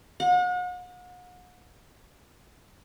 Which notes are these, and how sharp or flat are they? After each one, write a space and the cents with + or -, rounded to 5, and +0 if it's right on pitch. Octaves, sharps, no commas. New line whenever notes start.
F#5 -40